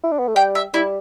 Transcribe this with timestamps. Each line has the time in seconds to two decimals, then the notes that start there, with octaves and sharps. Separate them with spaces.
0.04 E4
0.11 D4
0.19 B3
0.28 A3
0.35 G3 G5
0.55 E5
0.73 G3 E4